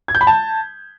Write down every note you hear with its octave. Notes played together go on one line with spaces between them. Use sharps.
G#6
G6
B5
A5